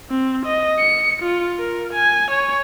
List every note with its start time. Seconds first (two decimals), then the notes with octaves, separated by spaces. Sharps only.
0.10 C4
0.46 D#5
0.79 C#7
1.23 F4
1.59 A#4
1.93 G#5
2.31 C#5